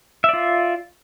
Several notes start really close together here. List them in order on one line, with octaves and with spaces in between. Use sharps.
E5 D5 F4